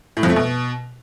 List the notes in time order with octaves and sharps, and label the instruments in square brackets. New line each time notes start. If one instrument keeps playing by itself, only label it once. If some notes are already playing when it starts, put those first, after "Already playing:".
[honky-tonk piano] A2
F2
A3
B2